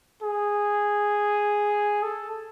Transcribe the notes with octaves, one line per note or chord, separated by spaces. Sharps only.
G#4
A4